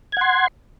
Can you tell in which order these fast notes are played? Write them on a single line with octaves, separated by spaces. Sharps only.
G#6 F#5 C6